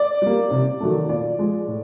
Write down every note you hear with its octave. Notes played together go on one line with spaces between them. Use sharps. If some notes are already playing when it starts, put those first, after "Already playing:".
Already playing: D5
G3 A#3
C3
D#3 F#3 A3
A#2 D5
F3 G#3
A2